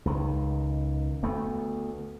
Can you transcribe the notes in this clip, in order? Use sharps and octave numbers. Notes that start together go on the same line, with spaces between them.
C#2 D#3
D2 A3 B3